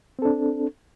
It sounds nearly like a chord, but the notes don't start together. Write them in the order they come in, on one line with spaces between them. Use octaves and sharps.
C4 A4 D4